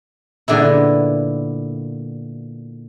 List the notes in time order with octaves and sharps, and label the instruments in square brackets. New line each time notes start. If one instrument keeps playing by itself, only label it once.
[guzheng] A#2 D3 B3 E4